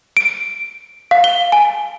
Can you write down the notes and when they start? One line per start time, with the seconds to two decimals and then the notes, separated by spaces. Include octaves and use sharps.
0.17 D7
1.11 F5
1.24 G7
1.52 G#5